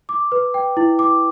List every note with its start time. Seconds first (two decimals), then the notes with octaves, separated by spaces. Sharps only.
0.09 D6
0.32 B4
0.54 G5
0.77 E4
0.99 D6